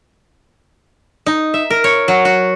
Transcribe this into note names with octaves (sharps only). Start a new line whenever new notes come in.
D#4
E5
A#4
C#5
F#3
F#4